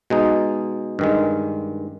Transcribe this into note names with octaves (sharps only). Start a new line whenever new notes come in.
B2 G#3 D#4
G2 D#3 G#3